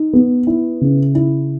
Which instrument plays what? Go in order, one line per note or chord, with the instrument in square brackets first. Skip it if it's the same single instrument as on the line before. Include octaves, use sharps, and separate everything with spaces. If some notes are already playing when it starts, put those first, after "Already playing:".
Already playing: [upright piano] D#4
B3
E4
C#3
E4